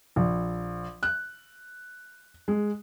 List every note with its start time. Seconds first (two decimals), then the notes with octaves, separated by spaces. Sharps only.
0.16 A#1
1.03 F#6
2.48 G#3